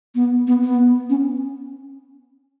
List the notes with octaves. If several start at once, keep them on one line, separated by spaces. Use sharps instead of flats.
B3
B3
B3
C#4